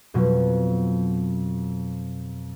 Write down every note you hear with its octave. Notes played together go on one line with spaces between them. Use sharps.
F2 B2 F#3